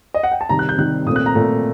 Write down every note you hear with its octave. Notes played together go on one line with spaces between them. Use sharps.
D#5
F#5
G5
A5
C3 D#3 G3 A#5
F#6
G6
C3 D#3 G3 F#6
A#2 A3 C4 D#6
F#6
A#5
A#2 A3 C4